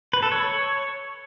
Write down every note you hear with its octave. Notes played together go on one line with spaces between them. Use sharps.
B4
A4
C#5